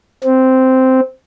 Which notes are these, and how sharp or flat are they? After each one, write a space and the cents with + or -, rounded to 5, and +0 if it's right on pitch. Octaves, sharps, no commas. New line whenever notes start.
C4 -5